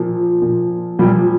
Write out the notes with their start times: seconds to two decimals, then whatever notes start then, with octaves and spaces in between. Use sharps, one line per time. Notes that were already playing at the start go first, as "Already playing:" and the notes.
Already playing: A#2 F3
0.42 A#2 F3
0.99 A#2 F3 G3